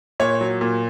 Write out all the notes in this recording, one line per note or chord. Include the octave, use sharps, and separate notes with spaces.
A#2 C#5
F#3
A#2